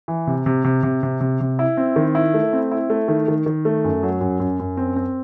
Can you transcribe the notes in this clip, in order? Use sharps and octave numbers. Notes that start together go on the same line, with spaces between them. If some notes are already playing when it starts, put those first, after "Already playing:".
E3
C3
C3
C3
C3
C3
C3
C3
E4
C4
D#3
E4
A3
C4
E4
A3
D#3
D#3
D#3
A3
F#2
F#3
F#2
F#2
F#2
C4
C4